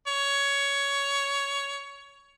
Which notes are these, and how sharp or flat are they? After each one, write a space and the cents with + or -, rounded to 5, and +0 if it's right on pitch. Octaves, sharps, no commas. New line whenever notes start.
C#5 +15